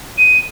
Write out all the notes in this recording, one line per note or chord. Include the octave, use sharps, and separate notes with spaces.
D#7